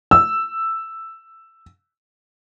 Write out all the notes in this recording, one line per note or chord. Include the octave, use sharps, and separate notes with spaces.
E6